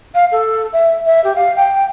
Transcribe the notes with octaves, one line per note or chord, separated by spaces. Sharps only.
F5
A4
E5
E5
G4
F5
G5